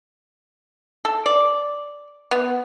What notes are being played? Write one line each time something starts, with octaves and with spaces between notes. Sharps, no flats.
A4
D5
B3